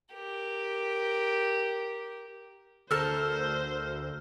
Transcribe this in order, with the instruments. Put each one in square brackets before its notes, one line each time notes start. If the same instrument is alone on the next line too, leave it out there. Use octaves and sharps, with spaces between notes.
[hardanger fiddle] G4 A#4
[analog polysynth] D2 [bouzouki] A4 A#4 A5 [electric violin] C5 [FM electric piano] E6 F6